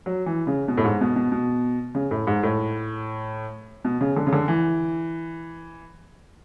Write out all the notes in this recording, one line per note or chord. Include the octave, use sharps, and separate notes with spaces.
F#3
E3
C#3
B2
A2
G#2
B2
B2
B2
C#3
A2
G#2
A2
B2
C#3
D3
C#3
D3
E3